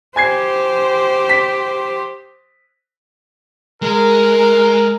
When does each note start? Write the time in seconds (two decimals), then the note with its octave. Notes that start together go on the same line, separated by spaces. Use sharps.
0.16 G4 C5 G#5 G#6 C7
1.29 B6
3.82 G#3 A#4